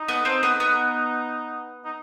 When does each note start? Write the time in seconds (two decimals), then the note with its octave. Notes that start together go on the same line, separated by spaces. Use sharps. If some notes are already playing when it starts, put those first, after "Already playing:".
Already playing: D#4
0.08 B3
0.25 C4
0.43 B3
0.60 B3
1.85 D#4